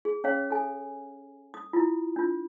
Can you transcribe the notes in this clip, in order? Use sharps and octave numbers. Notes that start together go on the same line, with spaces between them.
G#4
C#4 G#4 C#5 F5
A4 G#5
D#6
E4 F4
D4 F4